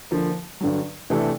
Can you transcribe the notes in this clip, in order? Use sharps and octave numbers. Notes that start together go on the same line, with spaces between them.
D3 F3 A#3
G2 D3 F#3
C3 E3 A3 D4